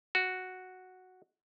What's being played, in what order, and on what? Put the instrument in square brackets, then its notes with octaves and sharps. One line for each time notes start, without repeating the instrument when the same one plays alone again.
[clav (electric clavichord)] F#4